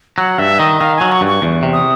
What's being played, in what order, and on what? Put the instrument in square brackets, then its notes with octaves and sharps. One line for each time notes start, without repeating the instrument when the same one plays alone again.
[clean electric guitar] F#3 [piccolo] F#5
[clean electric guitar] G2 [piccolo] E5
[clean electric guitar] D#3 [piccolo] D#5
[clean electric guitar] D#3 [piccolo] F5
[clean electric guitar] F#3 [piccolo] G#5
[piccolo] C#6
[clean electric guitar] G2
[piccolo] C#6
[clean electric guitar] E2
C3
[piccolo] D#6